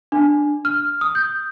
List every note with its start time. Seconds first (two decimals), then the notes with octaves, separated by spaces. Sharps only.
0.12 D4
0.65 F6
1.01 D#6
1.15 G6